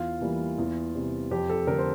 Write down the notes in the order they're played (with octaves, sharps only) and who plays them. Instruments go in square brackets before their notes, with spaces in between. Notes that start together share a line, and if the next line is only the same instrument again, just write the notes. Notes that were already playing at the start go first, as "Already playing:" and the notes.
Already playing: [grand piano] E2 F4
E3 G3 A#3
E2
C3 G3
F2 G4
A4
D3 A3 A#4
C5